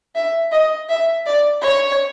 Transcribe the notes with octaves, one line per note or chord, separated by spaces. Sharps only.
E5
D#5
E5
D5
C#5